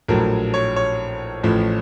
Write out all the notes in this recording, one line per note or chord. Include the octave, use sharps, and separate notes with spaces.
A#1 A2 F#3 A#4
C#5
C#5
A1 A2 F3